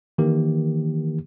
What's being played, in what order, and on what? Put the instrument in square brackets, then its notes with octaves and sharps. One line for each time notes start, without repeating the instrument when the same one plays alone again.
[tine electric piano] D#3 E3 A#3 G4